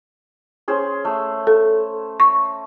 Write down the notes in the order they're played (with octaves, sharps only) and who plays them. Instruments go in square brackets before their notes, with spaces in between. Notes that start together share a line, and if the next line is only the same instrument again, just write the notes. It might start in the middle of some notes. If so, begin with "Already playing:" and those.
[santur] C#4 G#4 C5
A3
[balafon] A4
C#6